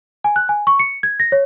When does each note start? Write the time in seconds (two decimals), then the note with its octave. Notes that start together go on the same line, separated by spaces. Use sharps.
0.24 G#5
0.36 F#6
0.49 G#5
0.67 C#6
0.80 C#7
1.03 G#6
1.20 A#6
1.32 C#5